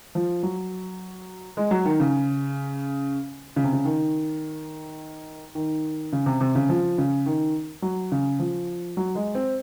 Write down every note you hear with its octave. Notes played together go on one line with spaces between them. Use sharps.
F3
F#3
G#3
F#3
D#3
C#3
C#3
C3
C#3
D#3
D#3
C#3
C3
C3
C#3
F3
C#3
D#3
F#3
C#3
F3
F#3
G#3
C4